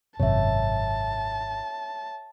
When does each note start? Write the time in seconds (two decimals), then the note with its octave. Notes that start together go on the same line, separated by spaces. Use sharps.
0.20 G#1 F#2 C3 C#5 E5 A5